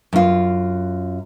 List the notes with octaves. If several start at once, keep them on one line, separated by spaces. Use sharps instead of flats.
F#2 F4